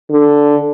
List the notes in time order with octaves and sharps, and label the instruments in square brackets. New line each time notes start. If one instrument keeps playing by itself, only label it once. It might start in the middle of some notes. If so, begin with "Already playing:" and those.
[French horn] D3